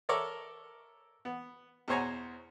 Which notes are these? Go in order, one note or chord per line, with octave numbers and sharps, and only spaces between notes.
A4 A#4 C#5 D5 E5
B3
E2 B2 C5 C#5 G#5 A#5